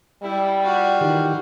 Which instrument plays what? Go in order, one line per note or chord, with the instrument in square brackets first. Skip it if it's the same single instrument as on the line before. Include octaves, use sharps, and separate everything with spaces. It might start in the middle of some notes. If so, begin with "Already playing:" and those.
[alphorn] G3 [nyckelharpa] E4
[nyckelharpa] F4 F#4
[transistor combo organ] D#3 E3 G4